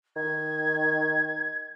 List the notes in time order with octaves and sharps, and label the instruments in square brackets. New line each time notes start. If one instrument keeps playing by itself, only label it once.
[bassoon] D#3 [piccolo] G#6